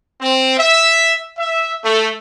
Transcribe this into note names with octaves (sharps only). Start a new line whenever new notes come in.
C4
E5
E5
A3